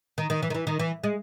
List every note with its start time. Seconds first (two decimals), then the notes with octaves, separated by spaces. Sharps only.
0.18 D#3
0.30 D#3
0.42 E3
0.50 D#3
0.54 E3
0.67 D#3
0.79 E3
1.03 G#3